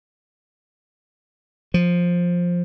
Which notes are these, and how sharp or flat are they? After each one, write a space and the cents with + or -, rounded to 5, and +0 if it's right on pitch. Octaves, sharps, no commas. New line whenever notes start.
F3 +10